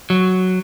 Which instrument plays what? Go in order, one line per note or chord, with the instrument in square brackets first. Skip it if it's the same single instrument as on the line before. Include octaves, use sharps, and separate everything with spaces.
[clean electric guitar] F#3